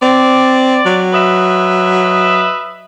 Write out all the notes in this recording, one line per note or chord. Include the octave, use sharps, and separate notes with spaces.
C4 D5
F#3
B4 D#5 E5